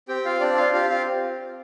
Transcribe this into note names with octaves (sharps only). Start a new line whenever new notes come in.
C4 G4 G5
F4 F5
C4 D4 D5
F4 F5
F4 G4 F5
F4 F5